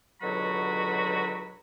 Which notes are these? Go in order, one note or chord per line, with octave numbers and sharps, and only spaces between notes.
C#2 B2 D3 F#3 F#4 B5